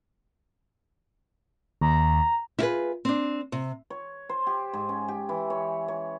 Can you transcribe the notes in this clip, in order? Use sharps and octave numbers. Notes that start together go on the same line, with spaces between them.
D#2 A#5
E4 F4 G#4 B4
C4 D4
C3
C#5
C5
G4
G#2
C#4
G4
E3
C#5
C#5